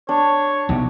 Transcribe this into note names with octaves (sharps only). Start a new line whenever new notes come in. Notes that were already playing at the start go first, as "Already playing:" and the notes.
D4 C#5
B1 C3